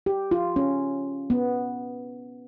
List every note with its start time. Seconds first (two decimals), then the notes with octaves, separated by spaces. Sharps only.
0.06 G4
0.31 F4
0.56 C#4
1.30 B3